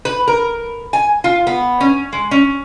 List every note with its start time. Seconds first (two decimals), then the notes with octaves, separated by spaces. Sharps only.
0.05 B4
0.28 A#4
0.93 G#5
1.24 F4
1.47 B3
1.81 C#4
2.13 G#3
2.31 C#4